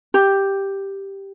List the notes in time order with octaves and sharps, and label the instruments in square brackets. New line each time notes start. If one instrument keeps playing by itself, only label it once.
[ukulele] G4